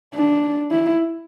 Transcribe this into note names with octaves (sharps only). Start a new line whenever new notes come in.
D4
E4